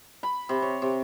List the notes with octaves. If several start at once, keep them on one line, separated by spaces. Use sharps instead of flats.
B5
C3
C#5
C3